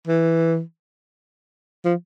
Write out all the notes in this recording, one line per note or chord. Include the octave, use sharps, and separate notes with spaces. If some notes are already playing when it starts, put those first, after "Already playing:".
E3
F3